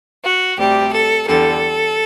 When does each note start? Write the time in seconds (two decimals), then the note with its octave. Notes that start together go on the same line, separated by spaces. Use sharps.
0.24 F#4
0.58 D2 C3 G3 G4
0.92 A4
1.26 E2 D3 G3 A4